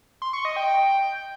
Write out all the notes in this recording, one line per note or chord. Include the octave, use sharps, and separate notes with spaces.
C6
C#6
D#5
G5